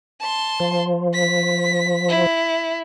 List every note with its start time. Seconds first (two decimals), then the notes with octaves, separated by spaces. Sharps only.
0.21 A5 C6
0.60 F3
1.14 B6
2.08 E4